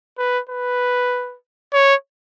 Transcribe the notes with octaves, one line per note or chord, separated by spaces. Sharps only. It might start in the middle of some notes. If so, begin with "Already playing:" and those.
B4
B4
C#5